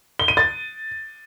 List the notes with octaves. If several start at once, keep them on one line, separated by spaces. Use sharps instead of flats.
G7
D#7
A6